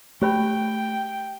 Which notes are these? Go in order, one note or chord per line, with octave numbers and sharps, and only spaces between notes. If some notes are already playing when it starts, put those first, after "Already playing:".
A3 G4 C5 G5 B5